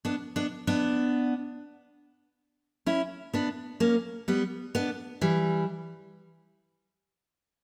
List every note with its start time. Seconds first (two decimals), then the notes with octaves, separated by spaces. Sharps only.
0.05 B3 D4
0.36 B3 D4
0.67 B3 D4
2.86 C#4 E4
3.34 B3 D4
3.80 A#3 C#4
4.28 G3 B3
4.75 B3 D4
5.21 E3 G3